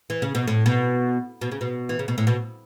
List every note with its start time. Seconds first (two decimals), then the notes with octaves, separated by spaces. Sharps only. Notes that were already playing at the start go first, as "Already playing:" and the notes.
0.10 E3
0.22 C#3
0.35 B2
0.48 A2
0.66 B2
1.41 B2
1.52 C#3
1.61 B2
1.89 E3
1.99 C#3
2.08 B2
2.18 A2
2.27 B2